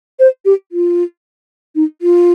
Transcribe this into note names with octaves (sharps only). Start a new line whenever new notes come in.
C5
G4
F4
D#4
F4